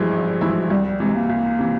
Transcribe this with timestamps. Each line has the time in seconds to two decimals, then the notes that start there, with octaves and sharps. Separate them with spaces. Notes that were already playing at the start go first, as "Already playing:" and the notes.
Already playing: G#1 G2 E3 F3 G#3 E4
0.12 G#1
0.41 G2 E3 G#3 E4
0.70 C2 G3
0.85 G3
1.00 C3 E3 G#3
1.15 A#3
1.30 C2
1.59 C3 E3